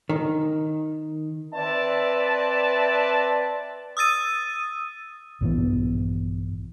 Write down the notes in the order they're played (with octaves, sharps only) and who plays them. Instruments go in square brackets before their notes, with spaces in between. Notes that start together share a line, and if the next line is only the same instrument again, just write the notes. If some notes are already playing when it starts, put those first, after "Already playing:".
[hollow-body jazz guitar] D#3
[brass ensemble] C4 B4 D5 E5 A5
[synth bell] D#6 E6 A6 D#7
[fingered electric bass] A#1 G2 E3 B3